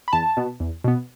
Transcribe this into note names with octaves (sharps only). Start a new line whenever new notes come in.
B5
E2 A5
B2 B3
E2
B2 B3